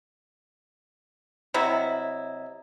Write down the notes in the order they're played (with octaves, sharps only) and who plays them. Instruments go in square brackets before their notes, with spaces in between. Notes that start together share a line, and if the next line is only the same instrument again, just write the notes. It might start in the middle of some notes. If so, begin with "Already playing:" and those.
[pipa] C3 F#3 E4 [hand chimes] D#5 A#5